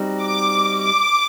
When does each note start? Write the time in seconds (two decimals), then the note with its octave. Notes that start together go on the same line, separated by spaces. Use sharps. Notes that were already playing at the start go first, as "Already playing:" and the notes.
Already playing: G3 C4 D#4 F#4
0.21 D6
0.80 D6